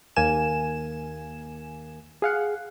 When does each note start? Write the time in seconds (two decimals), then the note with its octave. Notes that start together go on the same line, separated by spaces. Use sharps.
0.16 D#2 A#3 G#5 E7
2.22 G#4 F5 F#5